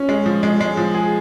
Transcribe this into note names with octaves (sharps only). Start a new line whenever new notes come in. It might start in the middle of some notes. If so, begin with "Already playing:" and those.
Already playing: C#4
G#3
F3
G#3
G#3
F3
G#4